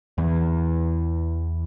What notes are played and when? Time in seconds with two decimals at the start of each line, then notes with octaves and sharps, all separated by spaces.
0.18 E2 E3